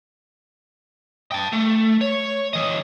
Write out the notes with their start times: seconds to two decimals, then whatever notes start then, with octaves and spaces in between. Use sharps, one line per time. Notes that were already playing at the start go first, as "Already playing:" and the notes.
1.32 G5 A5
1.53 A3
2.01 C#5
2.53 E3 D#5